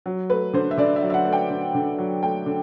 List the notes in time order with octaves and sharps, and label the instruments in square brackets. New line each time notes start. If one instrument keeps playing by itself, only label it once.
[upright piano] F#3
A3 B4
D3 C5
E5
D3 D5
E5
F#3
E5
F#5
A3
G5
D3
D3
F#3
A3 G5
D3